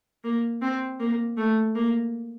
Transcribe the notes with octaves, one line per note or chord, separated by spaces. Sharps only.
A#3
C4
A#3
A3
A#3